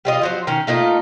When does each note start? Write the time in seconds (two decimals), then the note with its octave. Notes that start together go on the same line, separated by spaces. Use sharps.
0.05 G3 F4 D#5
0.21 F3 F#3 C5
0.47 D#3 C#4
0.67 A3 A#3 D#4 F4